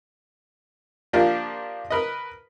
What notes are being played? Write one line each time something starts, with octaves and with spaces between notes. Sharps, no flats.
F3 A#3 D4 F4 G4 A#4
A#4 B4 D#5